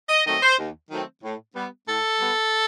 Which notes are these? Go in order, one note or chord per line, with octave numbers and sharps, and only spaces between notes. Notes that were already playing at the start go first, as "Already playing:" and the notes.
D#5
D#3 F#3 A3 C4 D#5
C5
D#2
D#3 F#3 A3 C4
A2
G3 B3
A2 A4
G3 B3